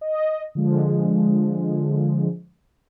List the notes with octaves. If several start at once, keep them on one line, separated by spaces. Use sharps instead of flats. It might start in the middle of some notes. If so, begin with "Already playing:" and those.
D#5
D3 F3 G#3